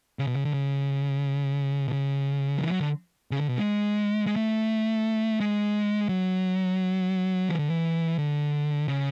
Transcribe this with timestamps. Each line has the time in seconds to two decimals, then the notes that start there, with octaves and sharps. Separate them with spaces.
0.19 C#3
0.27 B2
0.36 C#3
0.45 D3
0.54 C#3
1.88 B2
1.92 C#3
2.57 F#3
2.62 E3
2.71 F#3
2.80 D3
3.31 C#3
3.41 D3
3.49 B2
3.58 G#3
4.27 G#3
4.36 A3
5.40 G#3
6.09 F#3
7.49 E3
7.59 D3
7.70 E3
8.18 D3
8.88 C#3